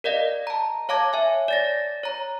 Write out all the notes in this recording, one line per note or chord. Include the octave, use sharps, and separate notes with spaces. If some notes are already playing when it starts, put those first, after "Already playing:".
A#4 D5 D#5 F5
A5 A#5
C#5 F5 A5 D6 G#6
C#5 E5 G#5
D5 A6 A#6
C#5 A#5